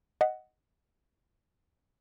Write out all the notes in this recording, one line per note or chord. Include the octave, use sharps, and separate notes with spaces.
D#5 F#5